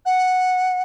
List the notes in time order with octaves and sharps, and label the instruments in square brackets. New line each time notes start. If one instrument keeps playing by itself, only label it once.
[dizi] F#5